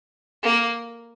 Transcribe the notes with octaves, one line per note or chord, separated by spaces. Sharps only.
A#3